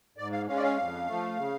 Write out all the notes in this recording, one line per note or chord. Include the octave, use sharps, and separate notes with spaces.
G#2 D5
F5
G#3 C#4 F5
D5
F5
F2
F3 A3
C#3